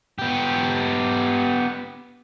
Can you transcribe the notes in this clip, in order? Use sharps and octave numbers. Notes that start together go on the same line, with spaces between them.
B3 G4